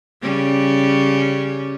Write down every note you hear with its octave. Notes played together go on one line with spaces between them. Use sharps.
C#3 G3 C#4